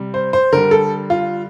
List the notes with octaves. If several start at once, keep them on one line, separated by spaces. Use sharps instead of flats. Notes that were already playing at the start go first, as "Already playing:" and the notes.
Already playing: C3 G3
C5
C5
D3 G3 A#4
A4
F4